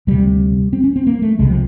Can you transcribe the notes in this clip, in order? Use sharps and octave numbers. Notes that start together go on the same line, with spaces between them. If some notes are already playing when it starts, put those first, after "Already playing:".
D2 C3 G3
C4
C#4
C4
A#3
A3
C2 C3 G#3
F3